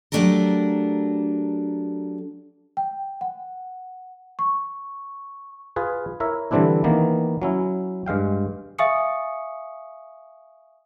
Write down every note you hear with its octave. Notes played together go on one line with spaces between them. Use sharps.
F#3 A3 D4 G4 A4 A#4
G5
F#5
C#6
F4 G#4 B4
E4 A#4 C#5 E5
D3 E3 G3 C4 D4 E4
D#3 E3 A#3 B3
F#3 C#4 E4
G2 G#3 F5 G5
E5 F5 G#5 C#6 D#6 C#7